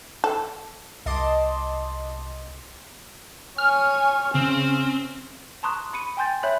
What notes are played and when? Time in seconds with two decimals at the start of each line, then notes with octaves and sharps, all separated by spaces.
0.24 A4
1.06 C2 D#5 A5 C6 D6
3.58 C#5 G#5 F6
4.35 C#3 C4 C#4
5.63 A5 A#5 C6 C#6 D#6 F#6
5.93 B5 C#7 D#7
6.17 G5 G#5 C6 G6 A6
6.43 C#5 E5 B5 F#6 G6 F#7